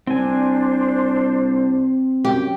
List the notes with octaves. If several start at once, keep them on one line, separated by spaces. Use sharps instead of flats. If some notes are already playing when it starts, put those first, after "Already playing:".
C2 C4 D4 C5 G#5
F#2 G4